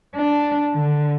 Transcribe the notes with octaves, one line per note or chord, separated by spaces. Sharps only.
D4
D3